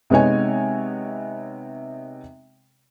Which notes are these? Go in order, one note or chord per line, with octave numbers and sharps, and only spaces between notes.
C3 G#3 B3 D#4 C#5 G#5